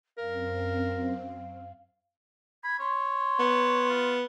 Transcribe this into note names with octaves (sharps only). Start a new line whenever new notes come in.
F#2 C4 A#4 F5
B5 G#6
C#5 C6
B3
F4